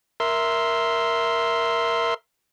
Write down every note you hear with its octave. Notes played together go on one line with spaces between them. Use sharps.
A#4 E5 C6